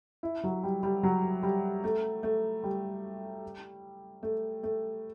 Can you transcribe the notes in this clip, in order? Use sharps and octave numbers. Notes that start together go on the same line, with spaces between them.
E4
F#3
G3
G3
F#3
G3
A3
A3
G3
A3
A3